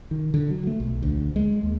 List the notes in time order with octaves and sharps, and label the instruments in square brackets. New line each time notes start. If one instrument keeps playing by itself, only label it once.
[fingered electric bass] D#3
D3
F#3
A3
B1
D2
G#3
D#2